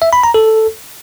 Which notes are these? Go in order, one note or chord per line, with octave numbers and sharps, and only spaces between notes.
E5
B5
A#5
A4